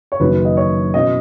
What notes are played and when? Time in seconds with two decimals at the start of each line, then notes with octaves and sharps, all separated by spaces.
0.12 C#5
0.20 F#1 F#2 D#3 F#3 B4
0.45 D#5
0.57 C#5
0.94 B2 F#3 C#4 E4 D#5